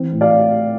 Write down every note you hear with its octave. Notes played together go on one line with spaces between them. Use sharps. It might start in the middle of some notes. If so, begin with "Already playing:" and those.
Already playing: E3 C4
A2
D5 F5